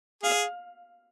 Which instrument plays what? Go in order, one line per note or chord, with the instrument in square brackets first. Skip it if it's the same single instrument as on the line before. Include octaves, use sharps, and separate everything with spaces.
[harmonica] G#4 [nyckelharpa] F5